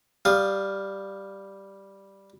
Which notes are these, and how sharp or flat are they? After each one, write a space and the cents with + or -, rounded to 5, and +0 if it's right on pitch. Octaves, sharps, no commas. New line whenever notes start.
G3 +0 F5 +0 D#6 -15